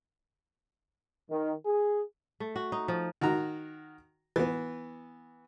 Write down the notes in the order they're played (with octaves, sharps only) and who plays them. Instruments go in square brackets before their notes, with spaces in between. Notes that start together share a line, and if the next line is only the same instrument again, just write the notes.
[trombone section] D#3
G#4
[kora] A3
F#4
D#4
F3
[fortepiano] D#3 F#4 A#5
E3 B3